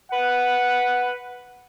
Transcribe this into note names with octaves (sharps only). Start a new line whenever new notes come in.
B4 F#5